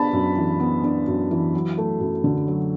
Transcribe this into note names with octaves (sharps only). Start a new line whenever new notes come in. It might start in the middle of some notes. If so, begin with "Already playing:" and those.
Already playing: B3 D4 A5 B5
F#2
E3
B3
D4
F#2
E3
F#3
A3
F#2
D3
F#3